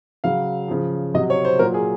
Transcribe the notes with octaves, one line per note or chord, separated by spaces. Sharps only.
C#3 F#3 F5
C#3 F3
C3 F#3 D#5
C#5
C5
A#2 F#3 A#4
G#4